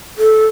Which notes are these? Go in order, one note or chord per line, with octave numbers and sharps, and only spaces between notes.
A4